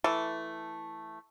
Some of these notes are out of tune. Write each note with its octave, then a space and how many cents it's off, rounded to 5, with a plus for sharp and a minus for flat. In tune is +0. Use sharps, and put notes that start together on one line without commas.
E3 +0 A3 +0 A4 +0